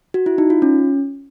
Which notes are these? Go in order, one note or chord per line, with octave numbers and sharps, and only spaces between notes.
F#4
E4
D#4
F4
C#4